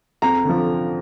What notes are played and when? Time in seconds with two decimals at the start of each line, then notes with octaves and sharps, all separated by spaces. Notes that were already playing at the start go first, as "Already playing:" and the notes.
0.22 F2 A#5
0.44 D3 F3